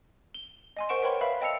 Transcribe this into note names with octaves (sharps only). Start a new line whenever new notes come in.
G7
D#5 G#5 C6
A#4 C5 F#5 C#6 D7 E7
A#4 B4 C#5 G5 B5 C6
B4 E5 F5 B5
D#5 G5 A5 E6 C#7 F7